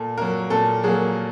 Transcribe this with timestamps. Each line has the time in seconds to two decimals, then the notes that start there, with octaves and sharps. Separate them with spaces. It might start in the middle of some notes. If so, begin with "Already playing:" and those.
Already playing: A#2 A4
0.17 F#3 A#3 A#4
0.50 A#2 A4
0.84 F#3 A#3 G#4